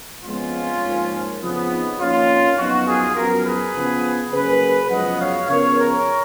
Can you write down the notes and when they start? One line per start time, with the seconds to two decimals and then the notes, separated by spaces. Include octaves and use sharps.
0.24 F2 F3 G#3 B3 C#4 F4
0.83 G#2 F3 A#3
1.41 F2 C#3 F3 B3
1.70 D#4
1.99 F2 D#3 A#3 C#4 F4
2.57 F#2 F3 B3 D#4 F#4
2.86 F4 G#4
3.15 F#2 F3 B3 F#4 A#4
3.45 G#4 B4
3.74 C#3 F3 B3
4.32 C#3 F#3 A#3 G#4 B4
4.90 F#2 C#3 F3 G#3 B3 D#5 F#5
5.19 C#5 F5
5.48 C#3 F3 B3 A#4 C#5
5.77 A#4 C#5